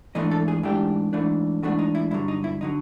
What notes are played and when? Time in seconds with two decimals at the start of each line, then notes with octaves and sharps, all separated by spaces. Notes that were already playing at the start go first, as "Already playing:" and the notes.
0.15 G#2 E3 A3 D4 D#5
0.31 A4
0.48 G#4
0.63 G#2 E3 A3 D4 G4
1.13 G#2 E3 A3 D4
1.63 G#2 E3 A3 D4 F#4
1.79 D#4
1.95 E4
2.11 G2 D3 F#3 E4
2.28 D#4
2.44 E4
2.61 D3 F#3 D#4